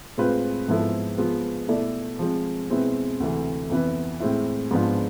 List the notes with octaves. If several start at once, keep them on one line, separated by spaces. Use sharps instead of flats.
A2 G#3 C4 F4 B4
G#2 F3 B3 E4 A4
F3 G#3 B3 F4
B2 A3 E4 A4 D5
F3 G#3 C4
B2 G#3 C4 E4 B4
D2 C3 E3 A3
F2 E3 B3 E4 B4
A2 G#3 C4 E4
G#2 F3 B3 D4 F4